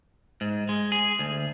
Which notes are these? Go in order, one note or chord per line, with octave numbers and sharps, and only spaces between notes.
G#2
G#3
G#4
D2